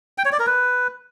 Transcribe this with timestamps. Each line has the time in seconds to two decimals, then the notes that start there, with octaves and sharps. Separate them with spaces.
0.18 G5
0.25 C#5
0.32 D5
0.39 A#4
0.47 B4